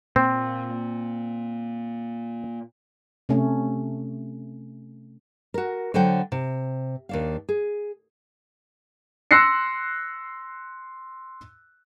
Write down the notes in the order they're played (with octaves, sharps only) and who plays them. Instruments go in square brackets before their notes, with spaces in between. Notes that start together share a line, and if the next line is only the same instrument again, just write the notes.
[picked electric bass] A#2 A#3 [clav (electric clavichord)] C4
[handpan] C3 A3 C#4
[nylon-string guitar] F#4 A#4
D3 F#3 C5 F#5 G5
C3
D#2 D4 F5
G#4
[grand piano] C6 E6 F#6 A#6 C7 C#7